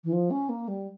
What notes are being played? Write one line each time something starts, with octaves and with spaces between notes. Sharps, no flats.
E3
F3
C#4
A#3
G3